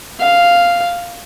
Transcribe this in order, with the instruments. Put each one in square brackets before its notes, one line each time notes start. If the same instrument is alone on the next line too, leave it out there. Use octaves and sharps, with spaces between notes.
[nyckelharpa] F5